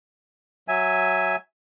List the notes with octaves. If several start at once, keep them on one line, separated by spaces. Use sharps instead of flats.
F#3 E5 G#5